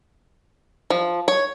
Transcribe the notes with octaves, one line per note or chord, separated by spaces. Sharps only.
F3
C#5